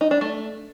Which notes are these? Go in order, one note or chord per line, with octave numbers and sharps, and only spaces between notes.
D#4
D4
A3